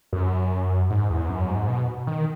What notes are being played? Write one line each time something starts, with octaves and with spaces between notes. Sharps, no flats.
F#2
G#2
E2
F#2
G#2
B2
D#3